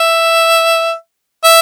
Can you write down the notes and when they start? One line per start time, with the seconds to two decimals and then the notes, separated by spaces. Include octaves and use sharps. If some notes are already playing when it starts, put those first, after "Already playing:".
Already playing: E5
1.44 E5